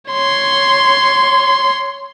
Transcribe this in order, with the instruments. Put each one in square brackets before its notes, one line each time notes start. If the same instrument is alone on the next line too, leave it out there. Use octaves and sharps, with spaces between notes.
[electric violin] C#5 C6